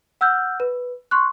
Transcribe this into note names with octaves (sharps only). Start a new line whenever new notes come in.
F#5 E6 F6 G6
B4
C6 C#6 F#6